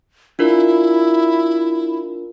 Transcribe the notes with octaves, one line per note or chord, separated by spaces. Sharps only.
D4 E4 F4 A#4